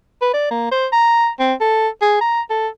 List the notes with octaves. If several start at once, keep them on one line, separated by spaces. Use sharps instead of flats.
B4
D5
A#3
C5
A#5
C4
A4
G#4
A#5
A4